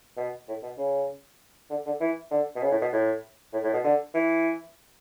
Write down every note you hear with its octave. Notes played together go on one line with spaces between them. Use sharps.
B2
A2
B2
C#3
D3
D3
E3
D3
B2
C#3
A2
B2
A2
A2
A2
B2
D3
E3